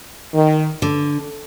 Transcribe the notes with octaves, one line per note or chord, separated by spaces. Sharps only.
D#3
D3